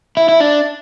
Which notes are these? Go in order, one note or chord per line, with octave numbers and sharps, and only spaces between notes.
E4
E4
D4